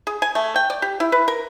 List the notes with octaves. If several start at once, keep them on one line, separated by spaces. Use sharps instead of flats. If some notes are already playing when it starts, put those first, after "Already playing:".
G#4
G#5
A3
G5
D5
G4
E4
B4
A#4